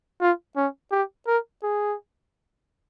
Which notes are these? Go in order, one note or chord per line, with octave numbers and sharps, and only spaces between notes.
F4
C#4
G4
A#4
G#4